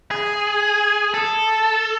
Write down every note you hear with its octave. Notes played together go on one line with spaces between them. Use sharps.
G#4
A4